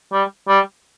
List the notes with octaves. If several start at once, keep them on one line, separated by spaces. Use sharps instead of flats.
G3
G3